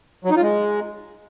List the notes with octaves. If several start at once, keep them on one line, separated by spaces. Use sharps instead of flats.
F#3
D#4
F4
G#3